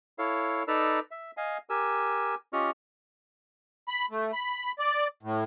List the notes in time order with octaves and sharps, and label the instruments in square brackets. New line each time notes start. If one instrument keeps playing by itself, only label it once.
[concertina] E4 A4 C#5 F5
D#4 A4 B4 D5 A#5 E6
E5
D#5 F5 G#5
G4 A#4 G#5 E6
C#4 F4 G4 D#5 C#6 F6
[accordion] B5
A3
B5
D5
A2